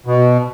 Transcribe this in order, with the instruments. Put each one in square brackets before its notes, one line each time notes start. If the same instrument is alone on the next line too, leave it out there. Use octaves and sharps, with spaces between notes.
[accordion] B2